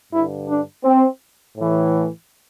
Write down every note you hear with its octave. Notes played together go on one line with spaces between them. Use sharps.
G2 D3 E4
D4
C4
A2 E3